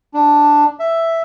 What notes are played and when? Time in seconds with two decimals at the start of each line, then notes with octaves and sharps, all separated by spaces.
0.14 D4
0.79 E5